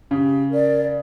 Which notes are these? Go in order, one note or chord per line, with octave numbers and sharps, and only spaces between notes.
C#3 G4
A#4 D5